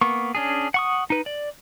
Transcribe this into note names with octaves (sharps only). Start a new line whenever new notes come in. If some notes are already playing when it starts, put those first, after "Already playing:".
A#3 B3 C#6
C#4 D4 G#4
F#5 C#6 D#6
D#4 B4
D5